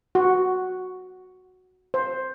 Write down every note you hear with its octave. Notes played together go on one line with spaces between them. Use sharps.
F#4
C5